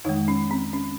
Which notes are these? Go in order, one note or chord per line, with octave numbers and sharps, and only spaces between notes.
F2 D#3 G#3 D#4
C#4
C4
C#4